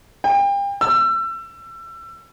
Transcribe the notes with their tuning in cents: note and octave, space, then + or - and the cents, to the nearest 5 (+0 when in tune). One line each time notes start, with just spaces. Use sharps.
G5 +35
E6 +30